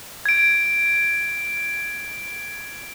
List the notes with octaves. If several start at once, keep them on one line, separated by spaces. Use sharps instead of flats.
G#6 D7